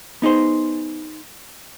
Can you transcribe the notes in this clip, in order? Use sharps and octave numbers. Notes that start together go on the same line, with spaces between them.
B3 D#4 G#4 C5